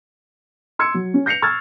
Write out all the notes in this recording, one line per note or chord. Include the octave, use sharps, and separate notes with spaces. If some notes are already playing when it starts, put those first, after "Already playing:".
C6 E6 G#6 C#7
F#3
C#4
G6 A#6 C7 C#7 F7
C#6 E6 F6 G#6 A6